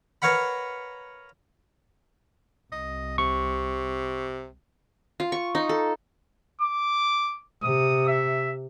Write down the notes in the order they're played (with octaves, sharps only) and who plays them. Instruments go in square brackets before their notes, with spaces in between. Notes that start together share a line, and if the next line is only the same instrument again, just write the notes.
[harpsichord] A#4 B4 C#5 F5 F#5 B5
[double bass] C2 [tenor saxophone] D#5
[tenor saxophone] C3 [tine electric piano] C#6
[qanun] F4
C#6
D#4
A4
[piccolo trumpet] D6
[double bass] C3 [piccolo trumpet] D#6
[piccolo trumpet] E5